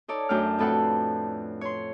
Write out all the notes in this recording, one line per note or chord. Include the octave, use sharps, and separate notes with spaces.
D#4 A4 C#5 D5
F#2 A3 D4 G5 F6
F2 A2 A4 B4 F#5 G5
C#5 C6